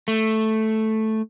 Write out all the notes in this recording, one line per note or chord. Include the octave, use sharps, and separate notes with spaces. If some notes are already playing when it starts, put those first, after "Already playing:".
A3